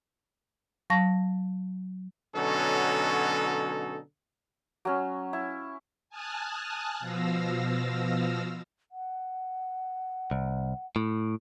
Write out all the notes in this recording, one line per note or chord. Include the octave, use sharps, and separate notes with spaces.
F#3 F5 A5 C#6 A#6
B2 D3 F#3 C#4 D#4 A4
F#3 C#4
E4
G#5 A5 D#6 F6 F#6
B2 F3 F5 E6 A#6
F#5
C2
A2